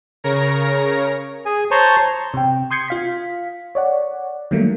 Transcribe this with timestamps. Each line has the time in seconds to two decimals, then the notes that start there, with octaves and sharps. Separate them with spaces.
0.24 C#3 A#4 C#5 A#6
1.46 G#4 G#5
1.71 C5 C#5 A5 A#5 C6 C#6
2.34 C3 G5
2.71 C6 D#6 G6 G#6 C7 C#7
2.88 F4 F5 B6
3.75 C#5 D5 F#5
4.51 D#3 F#3 G3 A3 A#3